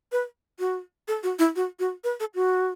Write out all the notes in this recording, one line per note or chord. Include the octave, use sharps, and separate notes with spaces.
B4
F#4
A4
F#4
E4
F#4
F#4
B4
A4
F#4